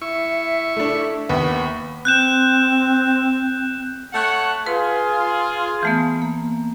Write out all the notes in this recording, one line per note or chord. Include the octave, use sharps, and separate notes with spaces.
E4 E5 C#6
A3 D4
D#2 B3 B5
C4 F#6 G6 E7
A3 C#5 F#5
F4 G#4 B4
E3 A3 B3
A#3